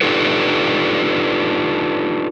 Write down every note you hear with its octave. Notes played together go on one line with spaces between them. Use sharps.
D4 D#4 F4 G4 A4 B4